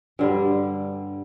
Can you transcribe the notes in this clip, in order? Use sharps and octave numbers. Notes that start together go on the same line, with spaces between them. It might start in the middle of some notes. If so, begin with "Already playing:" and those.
G2 D3 G3